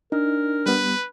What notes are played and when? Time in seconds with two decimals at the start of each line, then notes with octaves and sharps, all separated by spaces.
0.12 D4 D#4 A#4
0.66 G3 B3 B4